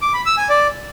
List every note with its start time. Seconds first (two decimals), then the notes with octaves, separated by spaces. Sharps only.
0.02 D6
0.14 B5
0.26 E6
0.38 G#5
0.50 D5